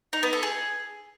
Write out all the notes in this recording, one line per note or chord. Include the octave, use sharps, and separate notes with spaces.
D#4
B3
A4
G#4